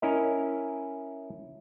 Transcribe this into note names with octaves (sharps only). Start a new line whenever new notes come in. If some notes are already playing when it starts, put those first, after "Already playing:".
C#4 E4 A#4 D#5